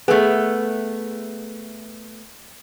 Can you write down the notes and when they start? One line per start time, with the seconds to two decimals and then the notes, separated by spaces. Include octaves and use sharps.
0.08 A3 B3 G#4